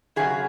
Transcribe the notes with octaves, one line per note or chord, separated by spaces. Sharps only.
F#2 C#3 F#3 G#4